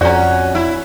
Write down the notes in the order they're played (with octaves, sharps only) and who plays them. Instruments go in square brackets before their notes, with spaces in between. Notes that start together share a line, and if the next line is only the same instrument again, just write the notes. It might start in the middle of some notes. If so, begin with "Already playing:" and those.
[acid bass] F2 [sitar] C#4 F#4 [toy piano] D5 A#5
[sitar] E4